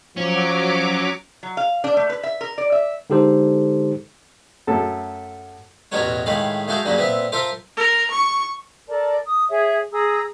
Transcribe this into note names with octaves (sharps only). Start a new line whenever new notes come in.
F3 F#3 C#4 D6
F#3
F5
D4
A3
B4
E5
A#4
D5
E5
D3 G#3 D#4 G4 A4 C5
F#2 A3 A4
A1 E2 B2 F#4 A#4 C#5
A2 D#3 G#3 F5 B5
G#3 A3 F#4 F5 G5
G2 C#3 F#3 G3 A#3
A#2 B3 C4 E5
F4 A4 A#4 C5 E5
A#4
C#6
A4 A#4 D5 A5
D#6
G#4 C#5 E5
G#4 A#5 D#6 E6